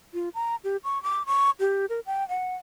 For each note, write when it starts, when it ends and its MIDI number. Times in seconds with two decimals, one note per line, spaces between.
0.14 0.29 65
0.34 0.56 82
0.64 0.77 67
0.84 1.01 85
1.03 1.23 86
1.26 1.51 85
1.60 1.86 67
1.89 2.00 70
2.06 2.27 79
2.29 2.55 78